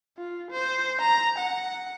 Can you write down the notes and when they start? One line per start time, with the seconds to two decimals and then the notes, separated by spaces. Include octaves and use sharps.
0.18 F4
0.51 C5
1.01 A#5
1.38 F#5